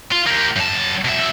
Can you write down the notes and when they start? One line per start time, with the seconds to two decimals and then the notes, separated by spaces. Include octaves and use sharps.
0.12 F4
0.27 A#3 G4
0.56 F#2 A5
1.05 B2 E5